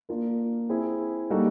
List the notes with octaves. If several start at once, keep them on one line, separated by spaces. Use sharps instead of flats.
A#3 D4 F4 A#4
C4 E4 G#4
G3 A#3 D#4 F#4 A4